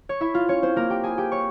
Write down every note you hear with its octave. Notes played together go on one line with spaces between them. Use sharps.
C#5
E4 E5
F4 F5
C#4 C#5
C4 C5
A#3 A#4
G4 G5
G#4 G#5
G4 G5
C#5 C#6